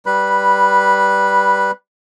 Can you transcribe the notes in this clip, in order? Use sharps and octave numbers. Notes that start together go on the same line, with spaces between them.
G3 B4 B5